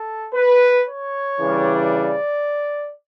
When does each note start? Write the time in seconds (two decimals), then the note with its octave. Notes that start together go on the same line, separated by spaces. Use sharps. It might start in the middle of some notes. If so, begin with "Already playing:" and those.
Already playing: A4
0.34 B4
0.87 C#5
1.40 C#3 E3 G3 D4
1.94 D5